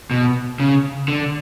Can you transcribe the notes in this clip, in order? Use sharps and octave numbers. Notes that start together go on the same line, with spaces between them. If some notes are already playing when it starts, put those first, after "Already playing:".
B2
C#3
D3